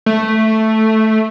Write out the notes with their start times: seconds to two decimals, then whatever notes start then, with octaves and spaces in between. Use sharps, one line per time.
0.06 A3